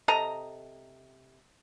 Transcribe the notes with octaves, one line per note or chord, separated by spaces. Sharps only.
C3 A4 D#5 A#5